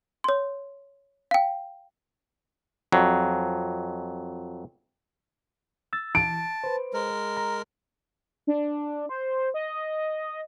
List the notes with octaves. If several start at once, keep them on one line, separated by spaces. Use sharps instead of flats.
C#5 C6
F5 G5
F2 F#3
E6 A6
E3 A5 D7
B4 C5
G#3 A#4
A#5
D4
C5
D#5